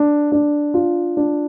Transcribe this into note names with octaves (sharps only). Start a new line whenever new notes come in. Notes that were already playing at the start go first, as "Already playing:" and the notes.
Already playing: D4
D4
F4
D4